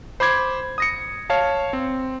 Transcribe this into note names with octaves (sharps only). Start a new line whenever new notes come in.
C5 B5 D6 G#6
D#6 A#6 C#7
C#5 F5 A5
C4